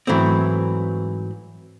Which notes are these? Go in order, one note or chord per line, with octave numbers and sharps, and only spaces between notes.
G#2 E3 F#3 A3 C4